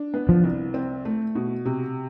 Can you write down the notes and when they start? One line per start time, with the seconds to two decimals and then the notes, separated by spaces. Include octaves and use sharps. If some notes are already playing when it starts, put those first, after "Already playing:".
Already playing: D4
0.14 B3
0.29 F3
0.44 C2
0.74 C4
1.05 A3
1.35 B2
1.65 C3